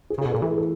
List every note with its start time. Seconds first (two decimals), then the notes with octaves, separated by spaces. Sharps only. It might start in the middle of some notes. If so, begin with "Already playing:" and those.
0.10 G#4
0.18 C#3
0.21 B2 G#4
0.32 A#2 A4
0.42 E3 G#4
0.58 A4